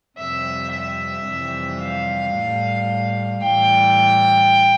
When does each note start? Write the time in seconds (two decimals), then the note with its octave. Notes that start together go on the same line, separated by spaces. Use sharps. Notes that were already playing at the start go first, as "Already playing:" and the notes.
0.19 F2 C3 G3 E5
0.73 E5
1.27 F2 C3 E3 G3
1.81 F5
2.35 A2 G3
3.43 A2 E3 G3 G5